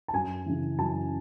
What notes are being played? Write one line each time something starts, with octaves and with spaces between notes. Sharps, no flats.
A5
F#2 G#5
C#3 E3
F#2 A5